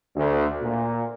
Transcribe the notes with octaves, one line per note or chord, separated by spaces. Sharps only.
D2
A#2